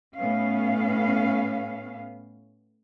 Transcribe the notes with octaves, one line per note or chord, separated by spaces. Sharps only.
A2 B3 C#4 F5